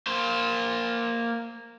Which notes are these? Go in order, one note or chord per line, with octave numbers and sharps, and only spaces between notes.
A#3 C5